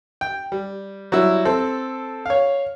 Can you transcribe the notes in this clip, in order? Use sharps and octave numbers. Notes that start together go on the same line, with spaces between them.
G5
G3
F#3 G3 E4
C4 A4
C#5 F5